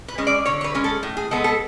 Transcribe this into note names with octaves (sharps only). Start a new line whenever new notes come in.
B4
G#3 C#4
D5
D3 C#5
C#5
B4
G#3 C#4
A4
A2
G#4
G#3 B3 A4
A4